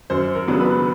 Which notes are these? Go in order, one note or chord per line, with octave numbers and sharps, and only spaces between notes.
F#2 C5
A#4
C#3 F#3 B3 D4
B4